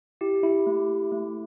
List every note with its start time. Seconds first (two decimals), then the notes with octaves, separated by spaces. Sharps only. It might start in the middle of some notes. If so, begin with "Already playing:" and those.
0.21 E4 G4
0.43 E4
0.66 A3
1.12 A3